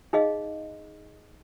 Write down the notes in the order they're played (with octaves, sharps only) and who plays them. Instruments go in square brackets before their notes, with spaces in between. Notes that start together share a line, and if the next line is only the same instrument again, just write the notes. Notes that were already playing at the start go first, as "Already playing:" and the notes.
[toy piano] D#4 G#4 D#5 F5